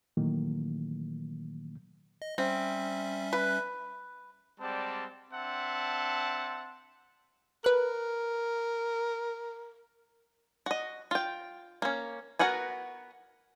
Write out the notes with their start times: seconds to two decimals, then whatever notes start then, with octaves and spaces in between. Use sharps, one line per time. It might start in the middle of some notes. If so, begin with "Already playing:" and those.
0.17 A#2 D#3 E3 F#3 A3 A#3
2.22 D#5
2.38 G3 C4 C#4 E5
3.33 B4
4.60 G3 G#3 C4 D5 F#5 A5
5.31 C4 D4 E5 F#5 A5 C6
7.64 A#4 B4 F#6
10.66 F#4 D#5
11.11 F4 G5
11.82 A#3 C#4
12.39 B3 F#4 A#4 F#5 G#5